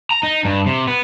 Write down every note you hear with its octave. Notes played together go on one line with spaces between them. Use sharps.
A#5
D#4
G2
C3
B3